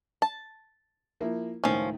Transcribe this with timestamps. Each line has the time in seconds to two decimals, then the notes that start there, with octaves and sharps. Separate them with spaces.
0.22 A5
1.20 F3 A#3 E4
1.64 C#2 A2 D#3 F3 C#4